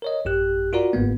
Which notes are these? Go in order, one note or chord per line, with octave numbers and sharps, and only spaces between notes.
A#4 C#5 D#5
A1 F#2 G4 F#6
F4 F#4 A#4 D5 A#5
G1 G#2 A#3 B3